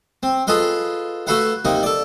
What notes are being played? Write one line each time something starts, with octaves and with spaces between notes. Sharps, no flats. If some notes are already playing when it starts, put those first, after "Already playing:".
C4
F4 G#4 A4 B4 D#5 F5
A3 F#4 A4 B4 F5 F#5
C3 A#3 D#4
A4 D5